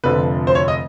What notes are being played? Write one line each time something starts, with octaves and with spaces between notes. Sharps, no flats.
F1 F2 D3 F3 B4
C5
C#5
D#5